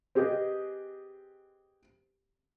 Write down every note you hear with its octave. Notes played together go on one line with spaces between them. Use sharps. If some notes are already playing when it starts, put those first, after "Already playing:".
C4 G4 G#4 B4 D#5